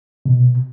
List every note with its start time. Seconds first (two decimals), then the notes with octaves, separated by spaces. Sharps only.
0.26 B2